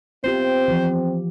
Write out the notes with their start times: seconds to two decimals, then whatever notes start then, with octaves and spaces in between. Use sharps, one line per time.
0.24 B3 C4 F4 G4 C5
0.68 E3 F3